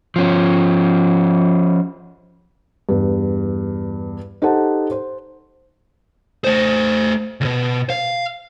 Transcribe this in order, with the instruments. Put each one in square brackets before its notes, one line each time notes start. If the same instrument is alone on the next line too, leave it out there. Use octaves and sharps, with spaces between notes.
[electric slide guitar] F3 C#4
[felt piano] E2 G2
D#4 G4 A4 C5 F#5 A5
C5
[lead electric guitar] A3 C5
C#2 B2
F5